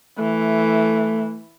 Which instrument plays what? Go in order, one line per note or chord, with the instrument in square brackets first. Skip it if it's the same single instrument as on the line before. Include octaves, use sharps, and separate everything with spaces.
[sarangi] E3 [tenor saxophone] A3